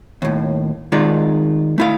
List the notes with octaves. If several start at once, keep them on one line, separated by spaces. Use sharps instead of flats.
D#2 A2
D#3 G#3 D#4 F4 D5
A3 E4 F5